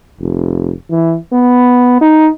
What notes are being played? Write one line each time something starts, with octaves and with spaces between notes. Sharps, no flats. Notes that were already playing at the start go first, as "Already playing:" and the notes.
F1
E3
B3
D#4